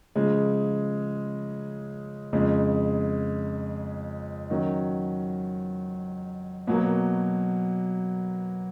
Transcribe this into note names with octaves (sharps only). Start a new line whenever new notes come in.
C#3 F3 G#3
F2 C#3 G#3
D#3 F#3 C#4
B2 F#3 A#3